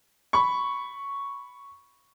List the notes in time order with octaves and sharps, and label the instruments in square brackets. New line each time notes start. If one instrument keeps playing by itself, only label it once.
[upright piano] B5 C#6